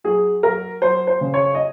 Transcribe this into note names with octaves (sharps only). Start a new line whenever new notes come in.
F#3 G#4
F#3 A#4
F#3 C5
C5
C#3
C#5
D#5